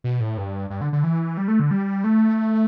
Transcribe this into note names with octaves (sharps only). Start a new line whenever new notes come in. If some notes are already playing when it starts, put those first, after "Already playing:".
B2
A2
G2
G2
D3
D3
E3
G3
A3
D3
G3
A3